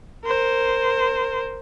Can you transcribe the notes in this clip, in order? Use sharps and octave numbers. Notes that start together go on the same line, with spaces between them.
A#4 C5